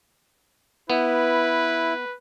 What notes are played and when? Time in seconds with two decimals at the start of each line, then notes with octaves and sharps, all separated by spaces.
0.90 B3 E4 B4